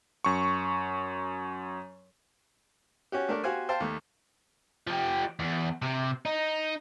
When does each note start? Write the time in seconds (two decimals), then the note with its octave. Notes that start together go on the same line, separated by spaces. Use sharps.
0.24 F#2 C#6
3.12 C#4 F#4 G4
3.29 A3 D4 A#4
3.44 F#4 G4 C5 F5 G#5
3.69 C5 F5 G5 A5
3.80 D#2 A3
4.87 F3 G4
5.39 E2
5.82 C3
6.25 D#4